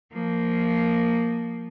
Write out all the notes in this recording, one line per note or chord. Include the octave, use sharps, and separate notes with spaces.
F3 A#3